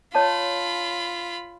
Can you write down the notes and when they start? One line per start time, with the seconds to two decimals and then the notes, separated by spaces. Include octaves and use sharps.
0.15 F4 C#5 D#5 A5 B5